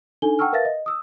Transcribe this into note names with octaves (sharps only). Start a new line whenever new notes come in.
D4 D#4 A4 G#5 G7
F#5 G5 A5 C#6 E6 F6
A#4 B4 E5 F5 A6 A#6
D#5
D#6 E6